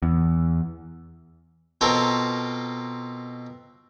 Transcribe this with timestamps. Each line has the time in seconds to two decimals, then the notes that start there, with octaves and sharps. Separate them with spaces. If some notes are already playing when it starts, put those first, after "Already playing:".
0.03 E2
1.81 B2 C4 F4 A4 A#4